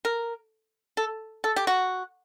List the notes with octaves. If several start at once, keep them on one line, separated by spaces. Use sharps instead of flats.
A#4
A4
A4
G4
F#4